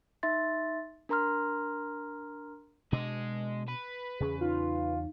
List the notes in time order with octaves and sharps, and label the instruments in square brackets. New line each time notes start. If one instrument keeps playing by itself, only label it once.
[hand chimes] D#4 E5 C6 A6
D4 A#4 A#5 C6 F6
[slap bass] B2 D4 [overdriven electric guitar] G#3 D#5
[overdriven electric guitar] B4
[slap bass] E2 C#3 C#4 [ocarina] G#4
[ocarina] D#4 [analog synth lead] F4